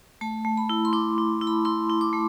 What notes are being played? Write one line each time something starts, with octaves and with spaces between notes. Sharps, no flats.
A3 A5
A3
B5
E4
C6
E4 D6
E4
E4
B5
E4 C6
E4
D6
A3